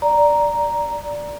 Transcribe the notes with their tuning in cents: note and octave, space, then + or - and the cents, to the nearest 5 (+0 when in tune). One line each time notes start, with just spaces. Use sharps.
D5 +0 A#5 +0